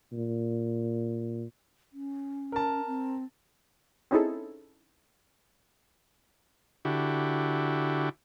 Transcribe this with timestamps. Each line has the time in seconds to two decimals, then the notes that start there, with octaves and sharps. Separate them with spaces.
0.13 A#2
1.93 C#4
2.52 A#4 A5
2.87 C4
4.11 C4 C#4 D#4 E4 G#4 A4
6.85 D3 E4 F#4 G4